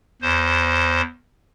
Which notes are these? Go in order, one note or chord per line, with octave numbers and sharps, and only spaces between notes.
E2 C5